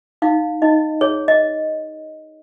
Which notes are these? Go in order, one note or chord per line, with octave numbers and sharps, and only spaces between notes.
D#4 F5
D#4 D#5
G#4 C#5
D#5